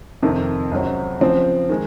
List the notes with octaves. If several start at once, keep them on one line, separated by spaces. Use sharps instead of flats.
F2 C3 D#3
C#2 C3 F#3 C4
C#3 F3 C4
D#3 G#3